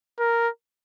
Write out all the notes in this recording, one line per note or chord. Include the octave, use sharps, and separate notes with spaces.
A#4